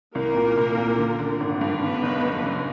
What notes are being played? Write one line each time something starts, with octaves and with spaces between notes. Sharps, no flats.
C2 A#3 A#4
A#2
C2
A#2
D3
D3
G#1
G2
D3 B3 B4
F#1
F#2
F#2